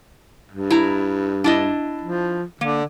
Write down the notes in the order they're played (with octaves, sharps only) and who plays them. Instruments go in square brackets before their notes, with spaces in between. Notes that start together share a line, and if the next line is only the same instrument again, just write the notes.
[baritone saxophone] G2
[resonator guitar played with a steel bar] E4 A#5
D4 E4 D#5
[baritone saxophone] F3
[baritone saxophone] D3 [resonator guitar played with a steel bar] A#3